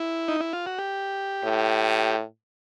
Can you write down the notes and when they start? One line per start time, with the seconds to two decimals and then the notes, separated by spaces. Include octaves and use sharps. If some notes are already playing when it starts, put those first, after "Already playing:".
Already playing: E4
0.28 D#4
0.40 E4
0.53 F4
0.66 F#4
0.79 G4
1.44 A2